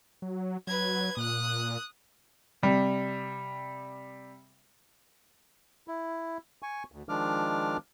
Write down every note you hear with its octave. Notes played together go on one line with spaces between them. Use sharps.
F#3
F#3 B4 G#6
A#2 D#6 F#6
C3 G3
E4
G#5 C#6
D2
D#3 F3 G#3 D4 D6 F6